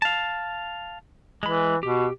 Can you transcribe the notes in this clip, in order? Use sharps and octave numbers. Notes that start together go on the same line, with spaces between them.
F5 A5
E3 G#3 B5
B2 G4